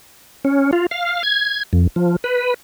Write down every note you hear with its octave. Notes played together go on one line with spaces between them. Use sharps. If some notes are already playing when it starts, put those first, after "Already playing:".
C#4
F4
F5
G#6
F2
F3
B4